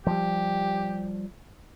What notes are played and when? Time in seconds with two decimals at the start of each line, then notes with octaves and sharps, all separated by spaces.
0.07 F3 G3 G4